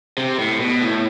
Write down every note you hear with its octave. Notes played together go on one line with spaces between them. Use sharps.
C3
A2
B2
A2